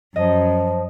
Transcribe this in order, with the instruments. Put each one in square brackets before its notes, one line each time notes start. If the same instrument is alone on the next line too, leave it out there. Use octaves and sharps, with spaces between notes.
[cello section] F#2 [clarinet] F3 [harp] D#5